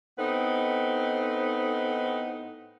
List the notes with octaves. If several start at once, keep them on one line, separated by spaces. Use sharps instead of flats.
A2 B3 C4 D#4